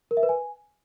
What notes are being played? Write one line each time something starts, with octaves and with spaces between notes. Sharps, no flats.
A#4
E5
B4
G#5